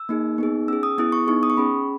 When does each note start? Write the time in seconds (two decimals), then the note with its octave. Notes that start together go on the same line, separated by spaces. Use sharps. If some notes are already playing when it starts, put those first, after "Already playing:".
Already playing: E6
0.09 A#3 D#4 G#4
0.38 B3 D#4 G#4
0.68 C#4 G#4 E6
0.83 D#6
0.98 B3 E4 G#4 D#6
1.12 C#6
1.27 B3 D#4 G#4 C#6
1.43 D#6
1.50 C#6
1.57 C#4 G#4 B5